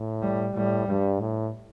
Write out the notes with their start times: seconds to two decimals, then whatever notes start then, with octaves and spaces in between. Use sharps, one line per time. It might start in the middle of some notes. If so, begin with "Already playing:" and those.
Already playing: A2
0.22 G3
0.54 A2 G3
0.88 G2
1.20 A2